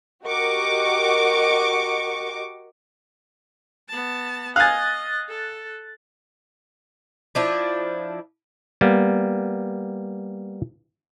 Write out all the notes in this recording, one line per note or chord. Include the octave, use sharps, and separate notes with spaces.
F#4 G4 A#4 D#5 C#6 D6
B3 A5
D#5 F5 G#5 F#6 A6
A4
F3 D4 E4
G3 A#3 B3